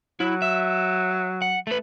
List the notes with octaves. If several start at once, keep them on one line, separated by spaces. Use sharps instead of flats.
F#3 E4
E5
F#5
A3 B4